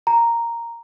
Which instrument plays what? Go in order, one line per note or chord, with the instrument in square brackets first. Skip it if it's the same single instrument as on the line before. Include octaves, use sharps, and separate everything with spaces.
[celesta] A#5